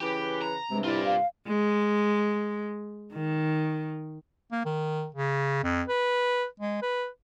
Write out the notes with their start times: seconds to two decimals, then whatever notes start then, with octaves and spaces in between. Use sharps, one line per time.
0.01 C#3 E3 G4 B4
0.42 A#5
0.71 G2 C3 G#3
0.84 E4 F4 D5
1.05 F5
1.48 G#3
3.13 D#3
4.52 A#3
4.65 D#3
5.14 C#3
5.63 F2
5.88 B4
6.60 G#3
6.82 B4